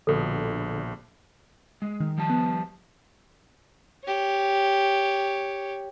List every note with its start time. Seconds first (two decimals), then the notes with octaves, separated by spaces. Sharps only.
0.07 A#1 B2 D3 A4
1.82 G#3
2.00 D#3
2.18 F3 G3 A5
2.30 B3
4.05 G4 C#5